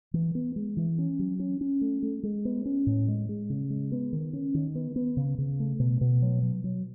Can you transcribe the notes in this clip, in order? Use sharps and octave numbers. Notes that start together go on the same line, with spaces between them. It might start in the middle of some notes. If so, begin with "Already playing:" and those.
E3
B3
G#3
E3
C#4
F#3
C#4
C#4
A3
A3
G#3
B3
C#4
A2
G#3
G#3
C#3
G#3
B3
D#3
C#4
D#3
B3
B3
C#3
C#3
A3
B2
B2
F#3
F#3
F#3